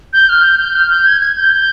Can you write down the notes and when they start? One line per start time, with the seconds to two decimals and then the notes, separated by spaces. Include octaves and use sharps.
0.13 G6
0.29 F6
0.44 G6
0.59 G6
0.76 F6
0.90 G6
1.06 G#6
1.21 G#6
1.37 G6